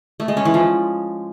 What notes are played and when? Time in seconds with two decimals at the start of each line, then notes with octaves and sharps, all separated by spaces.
0.20 A3
0.28 G#3
0.37 C#4
0.45 E3
0.54 F3